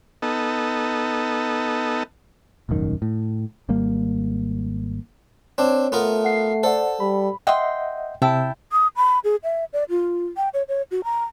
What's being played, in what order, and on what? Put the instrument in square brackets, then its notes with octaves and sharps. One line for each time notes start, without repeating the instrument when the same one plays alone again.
[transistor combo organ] B3 D#4 A4
[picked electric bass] E1 A1 F#2 D#3
A2
G#1 G3 A#3
[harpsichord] C4 D4 [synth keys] C#5
[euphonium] A3 [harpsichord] B3 F4 A#4
[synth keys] F#5 C7
[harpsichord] A4 [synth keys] C5 D5 F#5
[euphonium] G3 [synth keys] B5
[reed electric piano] D#5 E5 F#5 [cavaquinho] G5 C6
[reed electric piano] C3 E6 [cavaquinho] E4 G5 A5
[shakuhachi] D#6
B5
G#4
E5
D5
F4
G5
C#5
C#5
F#4
A#5